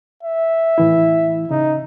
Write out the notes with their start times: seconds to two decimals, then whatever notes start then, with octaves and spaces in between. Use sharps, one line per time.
0.23 E5
0.78 A2 E3 E4
1.51 C#3 D#4